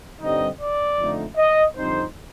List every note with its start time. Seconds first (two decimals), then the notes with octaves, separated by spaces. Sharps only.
0.20 G2 D3 G3 C4 D#4 D#5
0.60 D5
0.98 F2 D3 A3 D#4
1.37 D#5
1.76 F2 D3 G3 C4 D#4 C5